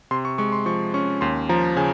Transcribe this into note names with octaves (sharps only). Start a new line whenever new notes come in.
C3 C6
C#6
G#3 C#6
C6
F3 C#6
C#4 C#6
D#2 C6
F3 A#5
C#3 G#5